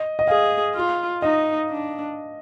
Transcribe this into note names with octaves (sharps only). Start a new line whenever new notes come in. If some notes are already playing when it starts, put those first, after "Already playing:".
Already playing: D#5
D#5
G#4 F5
F4
D#4 D#5
D4